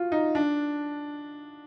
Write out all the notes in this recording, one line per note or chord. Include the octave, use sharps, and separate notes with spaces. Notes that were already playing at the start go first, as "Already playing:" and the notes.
Already playing: F4 F#4
D#4
D4